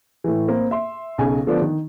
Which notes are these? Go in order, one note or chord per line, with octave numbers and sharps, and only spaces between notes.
A2 E3
A#3 C4 C5
E5 C6
B1 C#3 G#5
D3 F3 A3 B3 D4
D#3